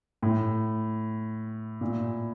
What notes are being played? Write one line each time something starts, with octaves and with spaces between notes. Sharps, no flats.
A2
A#2